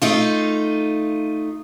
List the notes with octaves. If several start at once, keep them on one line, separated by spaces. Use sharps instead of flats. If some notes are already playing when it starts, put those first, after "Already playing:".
A3 D#4 F4